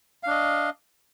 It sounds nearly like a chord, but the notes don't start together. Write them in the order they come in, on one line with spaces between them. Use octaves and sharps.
F5 D4 D#5